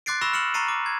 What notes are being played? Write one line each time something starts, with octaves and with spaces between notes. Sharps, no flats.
C6 D6 F#6 A6 C7 D7
B5 C#6 E6 A#6 E7 F7
F6 C#7 E7 F#7
A#5 C#6 A6 C7 C#7 D#7
D6
G#6